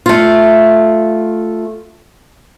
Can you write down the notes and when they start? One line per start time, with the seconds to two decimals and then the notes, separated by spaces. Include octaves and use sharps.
0.06 A3 F4